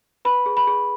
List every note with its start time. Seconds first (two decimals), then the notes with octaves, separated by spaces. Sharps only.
0.25 B4 B5
0.46 G#4
0.57 B5
0.67 G#4